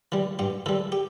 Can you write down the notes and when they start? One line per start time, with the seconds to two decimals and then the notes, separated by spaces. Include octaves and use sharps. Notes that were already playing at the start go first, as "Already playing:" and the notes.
0.12 E3 G3
0.39 G2 G4
0.66 E3 G3 A4
0.92 G4